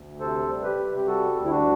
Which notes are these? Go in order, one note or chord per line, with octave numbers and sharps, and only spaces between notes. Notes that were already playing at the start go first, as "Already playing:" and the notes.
Already playing: D2
C3 A4 C5
G3
G4 B4
C3
G4
G3 F#4 A4
D2
E4
D4 F#4